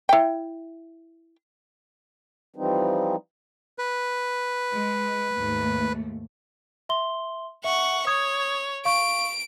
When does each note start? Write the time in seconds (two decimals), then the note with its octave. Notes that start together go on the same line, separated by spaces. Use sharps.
0.09 E4 G5
2.56 E3 F3 G3 C4 D#4
3.79 B4
4.73 G#3
5.34 D#2 G#2 A3
6.89 E5 C6 G7
7.64 E5 F#5 C#6
8.07 C#5 D#6 G#6
8.85 F5 C#6 D7